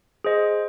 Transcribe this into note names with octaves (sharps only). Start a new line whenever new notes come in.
G#4 C5 D#5